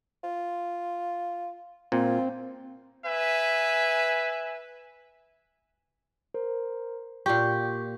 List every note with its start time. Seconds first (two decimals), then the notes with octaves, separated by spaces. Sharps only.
0.23 F4
1.92 A#2 C4 F4
3.04 B4 E5 G#5
6.34 A#4 C5
7.26 A#2 F4 G4 C#6